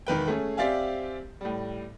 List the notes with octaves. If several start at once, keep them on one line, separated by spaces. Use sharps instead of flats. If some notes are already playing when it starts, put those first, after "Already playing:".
E1 D#3 B4 G5
A3 C#4 G#4
C4 G4 D5 E5 F5 G#5
A2 G3